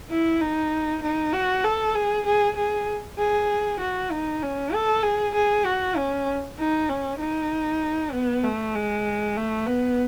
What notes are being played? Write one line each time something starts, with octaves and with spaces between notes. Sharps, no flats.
E4
D#4
D#4
F#4
A4
G#4
G#4
G#4
G#4
F#4
D#4
C#4
A4
G#4
G#4
F#4
C#4
D#4
C#4
D#4
B3
A3
G#3
A3
B3